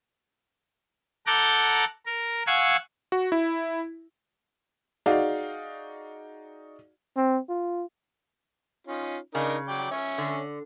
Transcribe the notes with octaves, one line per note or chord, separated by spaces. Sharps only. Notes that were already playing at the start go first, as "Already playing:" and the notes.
A4 F#5 A#5 D6 G6
A#4
F5 F#5 G#5 C#6 E6 G#6
F#4
E4
D#4 F#4 G#4 D5 F5
C4
F4
C#4 D#4 F4
C#3 D4 D#4 A#4
F#3 D5 G5
C#4 C#5 E5
D3